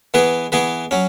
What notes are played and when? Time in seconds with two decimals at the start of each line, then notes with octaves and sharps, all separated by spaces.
0.14 E3 B3 G#4 B4
0.52 E3 B3 G#4 B4
0.91 F#3 C#4